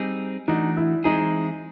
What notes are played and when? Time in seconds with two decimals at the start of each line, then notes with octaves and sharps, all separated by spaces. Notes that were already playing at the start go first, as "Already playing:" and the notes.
Already playing: G3 C4 D#4 G#4
0.48 E3 A3 D4 D#4 F#4
0.77 E4
1.04 E3 G#3 C4 D#4 E4 G#4